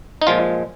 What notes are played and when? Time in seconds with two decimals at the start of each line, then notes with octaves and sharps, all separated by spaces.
0.21 D#4
0.27 A#2 F3 G#3 F4